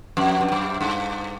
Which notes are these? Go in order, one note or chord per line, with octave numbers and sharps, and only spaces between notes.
F2
G2
F#2
G2